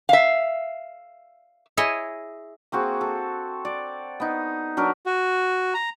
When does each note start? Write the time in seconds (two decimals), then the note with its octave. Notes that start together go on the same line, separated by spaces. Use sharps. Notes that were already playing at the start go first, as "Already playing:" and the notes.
0.09 E5 F5
1.77 E4 G#4 C#5 D#5
2.72 A#3 C4 F#4 G#4
3.01 A4
3.65 D5
4.20 B3 D#4
4.77 F#3 D4 A#4 B4
5.06 F#4
5.74 A#5